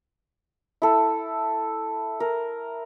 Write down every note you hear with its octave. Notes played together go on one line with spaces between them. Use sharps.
E4 A4
A#4